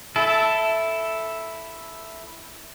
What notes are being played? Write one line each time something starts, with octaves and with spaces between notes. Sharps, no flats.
E4 A4